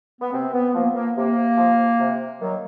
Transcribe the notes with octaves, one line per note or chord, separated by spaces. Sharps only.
B3
C3 C4
B3
F3 A#3
A#3
C3 A#3
F3
C3
D#3 F#3